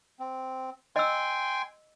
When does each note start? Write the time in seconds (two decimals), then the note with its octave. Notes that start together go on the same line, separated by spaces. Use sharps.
0.19 C4
0.96 D#5 G5 G#5 C6 E6